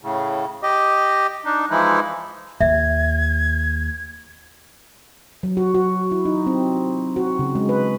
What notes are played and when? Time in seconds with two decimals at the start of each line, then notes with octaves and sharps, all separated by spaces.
0.02 A2 C#3
0.63 G4 D#5
1.45 D4 D#4
1.70 E3 F3 G#3 D#4 E4
2.60 D#2 E5 G#6
5.43 F#3
5.57 F#4
5.75 F#4
6.12 E4
6.25 D#4
6.47 C4
7.16 F#4
7.39 C#3
7.55 G#3
7.69 B4